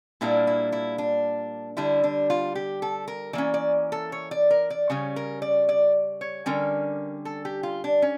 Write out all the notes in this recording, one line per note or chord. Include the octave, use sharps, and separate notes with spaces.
A#2 G3 A#3 D4 E4
E4
E4
D4
D3 G3 D4 E4
D4
F4
G4
A4
A#4
E3 A#3 C#4 D5
D5
A4
C#5
D5
A#4
D5
C#3 G3 C#4 C#5
A#4
D5
D5
C#5
D3 G3 C#4 A#4
A4
G4
F4
D4
C#4